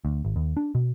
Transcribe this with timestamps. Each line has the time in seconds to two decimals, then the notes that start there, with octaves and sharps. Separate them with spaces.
0.05 D2
0.25 G#1
0.36 D#2
0.57 D4
0.75 B2